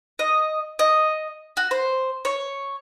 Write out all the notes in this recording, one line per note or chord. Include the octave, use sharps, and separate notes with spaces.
D#5
D#5
F#4
C5
C#5